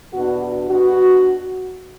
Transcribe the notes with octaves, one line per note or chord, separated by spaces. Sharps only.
E2 B2 B3 D4 F#4
F#4
B2 B3 D4 F#4